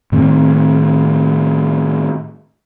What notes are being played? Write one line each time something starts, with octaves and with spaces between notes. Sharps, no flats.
A2 D#3 C4